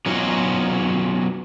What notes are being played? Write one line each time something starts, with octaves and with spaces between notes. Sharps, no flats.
F#3 B3 C#4 D#4 F4 F#4